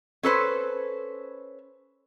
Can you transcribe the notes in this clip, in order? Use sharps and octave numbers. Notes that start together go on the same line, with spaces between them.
C#4 A4 B4 C5